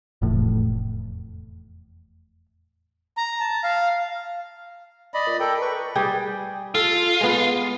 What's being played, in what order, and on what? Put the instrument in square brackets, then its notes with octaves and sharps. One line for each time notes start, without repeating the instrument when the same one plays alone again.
[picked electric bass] F1 E2 A2
[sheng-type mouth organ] A#5
A5
F5
[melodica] D5 D#5 B5
[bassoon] A#2
[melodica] A4 G5 [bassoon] A#4
[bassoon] B4 [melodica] C#6
[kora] G3 G4 G#4
[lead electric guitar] F4 [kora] A4
[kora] G#3 B3